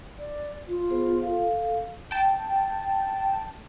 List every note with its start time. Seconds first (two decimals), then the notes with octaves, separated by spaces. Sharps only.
0.18 D5
0.67 F4
0.90 B3 G#4 C5
1.22 A4 F5
2.11 G5 A5